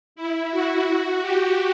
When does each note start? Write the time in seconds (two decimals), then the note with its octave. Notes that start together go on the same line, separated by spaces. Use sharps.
0.16 E4
0.51 F#4
1.21 G4